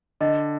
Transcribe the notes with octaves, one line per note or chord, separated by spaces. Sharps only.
D3 D#5 G5